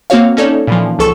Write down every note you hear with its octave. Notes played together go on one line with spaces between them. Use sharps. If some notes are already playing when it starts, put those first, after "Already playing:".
A#3 C4 F#4 C#5 F5
C#4 D#4 A4 C#5 D5
A#2 E3 F3
C#2 F3 A4 C#6 E6 E7